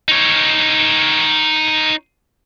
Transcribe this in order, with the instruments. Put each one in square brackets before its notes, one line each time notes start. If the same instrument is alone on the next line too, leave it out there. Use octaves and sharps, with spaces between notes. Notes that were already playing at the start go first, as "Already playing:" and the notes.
[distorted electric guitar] D#4 C#5